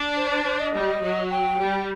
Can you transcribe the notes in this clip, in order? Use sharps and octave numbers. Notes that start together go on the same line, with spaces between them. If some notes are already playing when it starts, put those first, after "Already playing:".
Already playing: D4
C5
C5
C5
D#5
G3
F#3
G5
G3